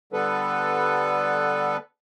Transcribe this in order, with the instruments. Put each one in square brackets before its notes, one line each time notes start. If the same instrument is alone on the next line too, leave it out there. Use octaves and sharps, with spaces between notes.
[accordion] D3 G3 B3 A4 B4